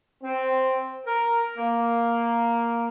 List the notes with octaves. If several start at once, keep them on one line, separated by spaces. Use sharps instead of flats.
C4
A#4
A#3